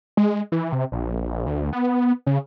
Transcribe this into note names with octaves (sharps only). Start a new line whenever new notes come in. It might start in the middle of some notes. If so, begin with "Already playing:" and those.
G#3
E3
C3
A#1
D2
B3
C#3